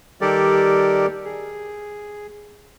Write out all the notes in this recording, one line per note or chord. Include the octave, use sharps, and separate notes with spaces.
D#3 G3 G4 A4 A#4 D5
G#4